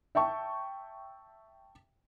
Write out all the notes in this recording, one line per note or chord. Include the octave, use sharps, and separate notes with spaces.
E5 G5 A5 C#6